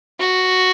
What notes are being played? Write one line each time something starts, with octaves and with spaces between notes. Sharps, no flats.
F#4